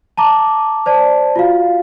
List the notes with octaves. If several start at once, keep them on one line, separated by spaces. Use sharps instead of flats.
A5 A#5 D6
C5 D5 A5
F4 F#4 F5